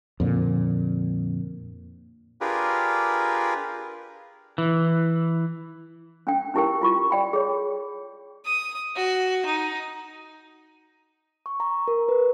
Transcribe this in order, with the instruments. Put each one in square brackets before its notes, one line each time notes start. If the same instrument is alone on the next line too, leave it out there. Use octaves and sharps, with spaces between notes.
[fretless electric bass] F2 A#2 D3
[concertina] D4 F4 G4 G#4 A#4 B4
[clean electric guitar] E3
[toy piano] C#4 D4 G5
C#4 D#4 E4 G4 A#4 G5
E4 F4 C#6
D5 G5 B5
G#4 C#5
[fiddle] D#6
F#4
D#4
[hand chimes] C#6
A#5
A#4
B4